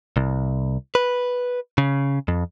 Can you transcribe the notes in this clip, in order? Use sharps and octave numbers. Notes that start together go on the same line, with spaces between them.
C2
B4
C#3
F2